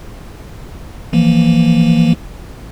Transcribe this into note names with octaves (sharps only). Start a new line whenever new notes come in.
E3 F3 A#3